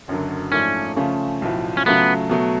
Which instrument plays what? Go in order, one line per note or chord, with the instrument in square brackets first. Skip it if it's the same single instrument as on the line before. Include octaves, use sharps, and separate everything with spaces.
[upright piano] F#1 F#2 D3 F#3
[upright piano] G#2 F3 A3 D4 [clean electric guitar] C#4
[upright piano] C#3 F3 A3 C#4 F4
B1 A2 F3
[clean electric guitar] C#4
[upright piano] C#3 F#3 A3 F4 [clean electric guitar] B3
[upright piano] B2 F#3 A3